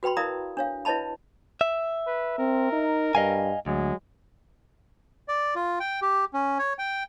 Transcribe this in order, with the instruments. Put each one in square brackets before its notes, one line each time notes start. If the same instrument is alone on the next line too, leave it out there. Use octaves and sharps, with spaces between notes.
[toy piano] F#4 B4 G5 B5 C6
E4 A#4 D5 F5 A#5 D#6
D4 C#5 F5
E4 B4 C#5 D#5 A5 B5
[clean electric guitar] E5
[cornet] B4
[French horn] C4 [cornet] A#4
[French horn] D#4
[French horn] G2 [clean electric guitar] D#5 F5 G#5
[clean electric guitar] D2 [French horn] F#3 [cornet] G#3
[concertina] D5
F4
G5
G4
C#4
C#5
G5